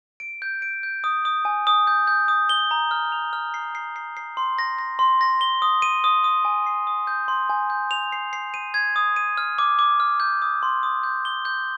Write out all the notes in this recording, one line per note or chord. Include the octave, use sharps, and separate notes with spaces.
D7
G6
D7
G6
D#6
D#6
G#5
D#6
G6
G6
D#6
G7
A#5
F6
F7
F6
C7
C7
C7
C7
C6
A#6
A#6
C6
A#6
G7
D#6
D#7
D#6
D#6
G#5
C7
D#6
G6
C6
G#5
G6
F7
C7
C7
D#7
G#6
D#6
D#7
F6
D6
D6
F6
G6
D#6
C6
D#6
G6
G7
G6